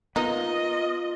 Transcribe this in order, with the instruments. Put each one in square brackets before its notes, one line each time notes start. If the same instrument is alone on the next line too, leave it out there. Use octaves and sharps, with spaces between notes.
[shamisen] A#3 D#4 [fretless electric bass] B3 [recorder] F4 [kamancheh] D#5